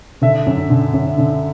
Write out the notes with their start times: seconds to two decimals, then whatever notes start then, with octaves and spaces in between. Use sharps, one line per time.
0.22 D3 E5
0.46 F#2
0.70 D3
0.93 F#2
1.18 D3